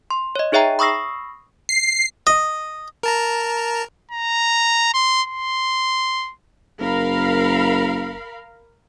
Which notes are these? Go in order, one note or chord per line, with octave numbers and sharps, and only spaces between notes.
C6
C#5 D#5
D#4 G#4 C#5 E5 G5 A#5
B5 C#6 D#6 E6 A#6 C7
C7
D#5
A#4 A5 A#5
A#5
C6
C6
F#1 A#4 F5 B5